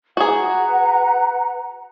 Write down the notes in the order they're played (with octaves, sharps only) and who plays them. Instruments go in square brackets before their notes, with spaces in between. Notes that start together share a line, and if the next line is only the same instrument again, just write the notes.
[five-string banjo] F#4 G#4 [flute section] B4 F#5 A#5